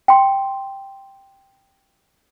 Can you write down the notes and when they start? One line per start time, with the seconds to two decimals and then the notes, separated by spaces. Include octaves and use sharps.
0.08 G5 C6